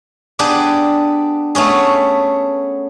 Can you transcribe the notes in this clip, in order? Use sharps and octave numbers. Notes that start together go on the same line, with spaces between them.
B3 D4 G4 G#4 B4
A3 B3 C#4 G#4